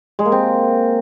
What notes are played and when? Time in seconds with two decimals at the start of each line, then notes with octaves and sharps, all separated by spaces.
0.19 G#3
0.25 A#3
0.32 C4